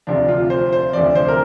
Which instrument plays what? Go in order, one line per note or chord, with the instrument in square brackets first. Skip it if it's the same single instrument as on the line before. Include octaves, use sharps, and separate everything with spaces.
[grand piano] D2 C3 F3 D4
F4
C5
C5
D2 C3 F3 D5
C5
A#4